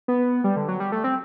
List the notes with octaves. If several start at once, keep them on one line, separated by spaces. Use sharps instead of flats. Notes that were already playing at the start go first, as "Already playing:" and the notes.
B3
G3
D3
F#3
G3
A3
C4